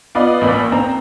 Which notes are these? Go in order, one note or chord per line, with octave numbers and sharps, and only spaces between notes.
B3 F4 B4 D5 D#5
A1 E2 A#3 B5
C4 A#5